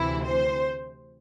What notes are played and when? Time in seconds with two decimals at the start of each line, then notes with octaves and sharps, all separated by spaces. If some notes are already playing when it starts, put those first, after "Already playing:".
Already playing: D2 C3 E3 E4
0.23 C5